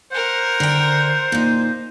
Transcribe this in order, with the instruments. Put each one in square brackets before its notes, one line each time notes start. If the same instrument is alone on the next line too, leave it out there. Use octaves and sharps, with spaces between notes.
[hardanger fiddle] A#4 F#5 [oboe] C5
[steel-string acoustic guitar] D3 G5
A#2 D#4